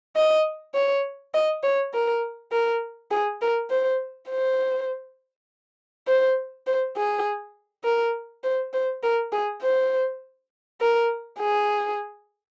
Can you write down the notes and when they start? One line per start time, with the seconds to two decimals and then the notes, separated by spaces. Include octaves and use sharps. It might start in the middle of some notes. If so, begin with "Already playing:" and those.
0.16 D#5
0.75 C#5
1.34 D#5
1.63 C#5
1.94 A#4
2.52 A#4
3.11 G#4
3.42 A#4
3.70 C5
4.30 C5
6.07 C5
6.67 C5
6.97 G#4
7.84 A#4
8.44 C5
8.74 C5
9.03 A#4
9.32 G#4
9.62 C5
10.81 A#4
11.40 G#4